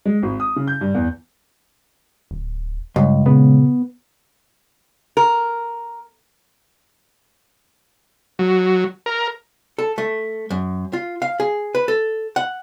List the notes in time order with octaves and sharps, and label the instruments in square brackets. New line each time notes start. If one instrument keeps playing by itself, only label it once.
[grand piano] G#3
G#1
D#6
C#3
G6
G2
E2
[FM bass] D1
[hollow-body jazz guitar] C#2 [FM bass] G2 [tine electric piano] D#5
[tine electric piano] A#2 C#3 [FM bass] B3
[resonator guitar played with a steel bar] A#4
[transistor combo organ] F#3
A#4
[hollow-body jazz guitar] A4
A3
F#2
F4
F5
G#4
B4
A4
F#5